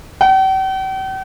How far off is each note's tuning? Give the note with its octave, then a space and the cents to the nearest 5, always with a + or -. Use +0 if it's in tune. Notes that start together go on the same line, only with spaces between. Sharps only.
G5 -45